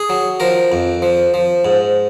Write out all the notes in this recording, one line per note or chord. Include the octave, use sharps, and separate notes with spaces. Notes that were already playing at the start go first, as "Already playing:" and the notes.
Already playing: G#4
F#3
F3 A#4
F2
F3
F3
G#2